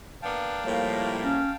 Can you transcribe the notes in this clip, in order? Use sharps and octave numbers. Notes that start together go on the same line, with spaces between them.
A#3 B3 D4 F5 G5 A5
A2 F3 G3 A#3
C#4